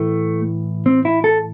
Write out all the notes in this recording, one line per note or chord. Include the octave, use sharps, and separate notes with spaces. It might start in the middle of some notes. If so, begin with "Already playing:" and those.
Already playing: A2 E3 A3
C4
E4
A4